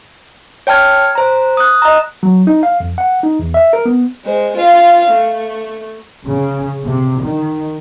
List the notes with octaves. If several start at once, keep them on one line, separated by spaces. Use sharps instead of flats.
C#5 G5 A5 F6 G#6
C5 A#5
D#6 F#6
D#5 A#5
F#3
D#4
F5
F2
F#5
D#4
E2
E5
A#4
B3
G#3 C5
F4 F5
A3
C#3
C3
D#3